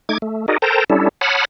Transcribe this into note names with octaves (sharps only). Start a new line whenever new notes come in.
A3 D#4 D6 G#6
A3
D#4 F#4 G#4 A#4 D5 D#5
A4 A#4 C5 G5 A5 A#5
G3 C#4 D4 E4 A4
C#5 F#5 A5 B5 D#6 F6